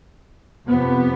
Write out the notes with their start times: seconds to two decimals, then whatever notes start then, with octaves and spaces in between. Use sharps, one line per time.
0.66 F2 C3 B3